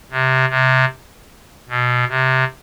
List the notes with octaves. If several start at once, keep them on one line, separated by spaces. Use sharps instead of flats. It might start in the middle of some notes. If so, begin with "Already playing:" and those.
C3
C3
B2
C3